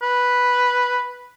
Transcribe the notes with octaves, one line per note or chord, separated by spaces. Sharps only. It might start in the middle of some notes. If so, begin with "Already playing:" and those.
B4